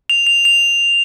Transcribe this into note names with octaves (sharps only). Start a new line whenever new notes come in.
F7
F7
F7